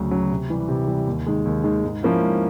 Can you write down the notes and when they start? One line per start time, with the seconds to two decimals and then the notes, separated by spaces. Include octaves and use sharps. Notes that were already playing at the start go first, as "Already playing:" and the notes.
Already playing: D2 C#3 F#3
0.11 C#3 F#3
0.31 C3
0.50 E3 G3
0.68 C3
0.87 E3 G3
1.07 D#2
1.27 D#3 G#3
1.45 D#2
1.64 D#3 G#3
1.84 G#2
2.03 F3 A#3 C#4 E4
2.22 G#2